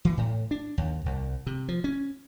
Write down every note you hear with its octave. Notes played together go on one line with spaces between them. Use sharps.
E3
A2
D4
D#2
C2
C3
F3
C#4